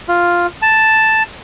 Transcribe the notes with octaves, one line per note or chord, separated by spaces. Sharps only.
F4
A5